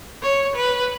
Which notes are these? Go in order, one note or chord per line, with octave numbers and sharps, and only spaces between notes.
C#5
B4